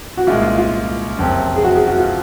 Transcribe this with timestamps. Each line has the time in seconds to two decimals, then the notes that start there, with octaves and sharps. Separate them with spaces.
0.17 F#4
0.27 C2 A#2 G#3 F4
0.42 F4
0.58 F4
1.18 F#1 F2 C3
1.56 G#4
1.64 F#4
1.75 G#4
1.87 F#4
1.99 F4